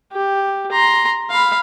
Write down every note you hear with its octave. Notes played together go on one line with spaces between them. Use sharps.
G4
A#5 C6
F5 B5